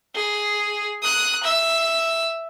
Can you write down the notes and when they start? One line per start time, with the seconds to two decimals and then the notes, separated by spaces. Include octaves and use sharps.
0.15 G#4
1.02 D#6 F#6
1.44 E5